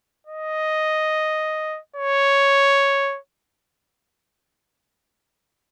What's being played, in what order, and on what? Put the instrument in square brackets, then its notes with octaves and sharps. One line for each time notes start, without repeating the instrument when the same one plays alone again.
[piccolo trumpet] D#5
C#5